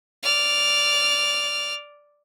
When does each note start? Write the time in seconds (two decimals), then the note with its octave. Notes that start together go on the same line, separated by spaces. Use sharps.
0.23 D5 F6